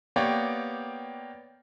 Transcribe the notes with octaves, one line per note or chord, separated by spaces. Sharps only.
A#3 B3 G4 C#5 D5